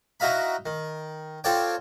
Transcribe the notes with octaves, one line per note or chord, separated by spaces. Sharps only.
D#4 E4 F#4 D#5 F5 B5
D#3
C4 F4 A4 C#5 D5 G5